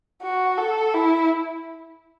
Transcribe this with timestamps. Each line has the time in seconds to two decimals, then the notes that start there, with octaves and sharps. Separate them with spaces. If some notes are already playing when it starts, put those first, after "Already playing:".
0.22 F#4
0.58 A4
0.94 E4